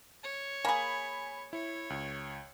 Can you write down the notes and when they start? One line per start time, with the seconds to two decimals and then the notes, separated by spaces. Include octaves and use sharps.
0.23 C#5
0.65 A#3 G#4 G#5 B5
1.53 E4 C#5
1.90 C#2